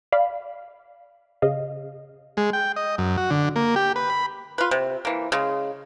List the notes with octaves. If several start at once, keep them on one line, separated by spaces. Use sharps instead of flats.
D5 F5 B5
C#3 D#5 F5
G#3
G5
D#5
F#2
F#4
D3
A#3
G4
B4
B5
F4 B4
C3
E3 A#3
C#3 G#3